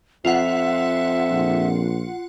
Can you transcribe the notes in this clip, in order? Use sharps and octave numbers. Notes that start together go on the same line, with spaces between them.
F2 F4 E5 F#5
A#1